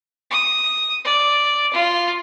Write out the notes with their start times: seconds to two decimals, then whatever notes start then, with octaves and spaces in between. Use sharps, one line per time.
0.31 D#6
1.05 D5
1.73 F4